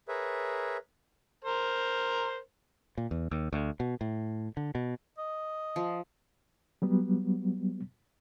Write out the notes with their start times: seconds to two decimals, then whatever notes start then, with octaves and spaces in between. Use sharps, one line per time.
0.08 G#4 A#4 B4 C#5 E5
1.44 A#4 C5
2.98 A#2
3.11 E2
3.31 D#2
3.53 D2
3.80 B2
4.01 A2
4.57 D3
4.75 B2
5.18 D#5
5.76 F3
6.82 F#3 G3 B3